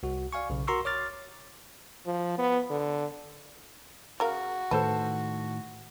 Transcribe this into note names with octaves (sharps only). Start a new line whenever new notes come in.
C2 F#4
D5 F5 G#5 C#6
B1 C#3
F#4 A#4 A#5 C6 C#6 E6
C#5 D6 F6 A6
F3
B3
D3
C#3 F#4 A#4 F5
A2 D#3 A4 B4 C5 A5